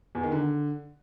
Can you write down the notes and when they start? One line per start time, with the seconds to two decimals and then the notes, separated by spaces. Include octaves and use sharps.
0.15 E2
0.23 D#3
0.32 D3